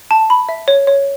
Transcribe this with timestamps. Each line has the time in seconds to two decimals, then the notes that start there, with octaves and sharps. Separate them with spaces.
0.11 A5
0.30 B5
0.49 E5
0.68 C#5
0.87 C#5